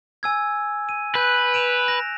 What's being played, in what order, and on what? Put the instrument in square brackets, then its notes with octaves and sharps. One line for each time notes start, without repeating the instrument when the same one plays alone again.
[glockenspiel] G#5 E6 G#6
D#7
[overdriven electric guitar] B4 [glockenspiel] F#6 G6
[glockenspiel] D7 E7 F7
A#6